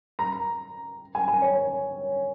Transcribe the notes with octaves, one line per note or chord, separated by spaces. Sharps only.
A#5
G#5
G#5
C#5